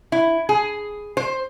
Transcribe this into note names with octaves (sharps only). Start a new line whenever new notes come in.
E4
G#4
C5